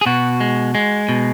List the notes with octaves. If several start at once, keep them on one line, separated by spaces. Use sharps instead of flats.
G#4
B2 F#4
G#3
G#3
B2